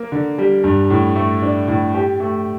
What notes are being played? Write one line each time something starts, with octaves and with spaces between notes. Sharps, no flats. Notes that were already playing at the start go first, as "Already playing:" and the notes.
Already playing: A#3
D3
G3
G2
A2
A3
D4
A2
G4
A3